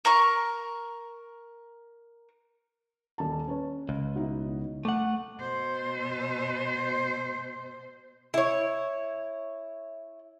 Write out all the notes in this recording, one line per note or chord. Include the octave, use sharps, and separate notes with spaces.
A#4 A#5 C#6
D#1 A5
C#4 B4 C#5
C#2
B2 D#4 E4
A3 F#5 D6
B2 C5
E4 C#5